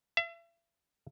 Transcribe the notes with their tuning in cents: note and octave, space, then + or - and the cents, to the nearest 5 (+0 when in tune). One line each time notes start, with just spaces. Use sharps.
E5 +40